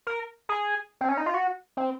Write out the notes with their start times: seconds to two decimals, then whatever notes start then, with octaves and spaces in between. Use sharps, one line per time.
0.07 A#4
0.49 G#4
1.01 C4
1.09 C#4
1.17 D#4
1.26 F4
1.34 F#4
1.77 C4